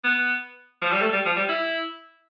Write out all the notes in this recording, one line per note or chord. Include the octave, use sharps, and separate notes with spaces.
B3
F3
G3
A3
G3
F3
G3
E4